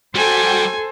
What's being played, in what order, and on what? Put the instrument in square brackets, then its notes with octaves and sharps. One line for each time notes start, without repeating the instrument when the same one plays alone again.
[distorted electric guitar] G3 [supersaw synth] F#4 G5 [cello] A4 C5 [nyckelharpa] G#5